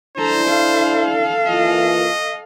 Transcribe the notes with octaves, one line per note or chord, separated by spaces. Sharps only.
D4 E4 A4 C5 A#5
A4 F5
E3 A#3 F4 D#5